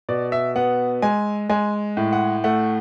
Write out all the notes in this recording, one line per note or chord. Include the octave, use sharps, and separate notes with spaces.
B2 D5
E5
B3 F#5
G#3 G#5
G#3 G#5
A2
F#5
A3 F#5